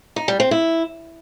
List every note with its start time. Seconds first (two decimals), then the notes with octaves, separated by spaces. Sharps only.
0.16 D#4
0.28 G3
0.40 C4
0.51 E4